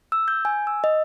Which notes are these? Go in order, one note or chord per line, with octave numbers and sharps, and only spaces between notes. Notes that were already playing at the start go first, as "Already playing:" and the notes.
E6
G6
G#5
E6
D#5